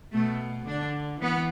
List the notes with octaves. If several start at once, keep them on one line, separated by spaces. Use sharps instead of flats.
B2 A3
D3 D4
E3 B3